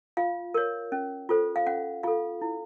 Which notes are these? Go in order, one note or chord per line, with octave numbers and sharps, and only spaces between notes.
F4 F5
A#4 C#5
C#4
F4 A4 C5
F5
C#4 F#5
F4 A4 F5
E4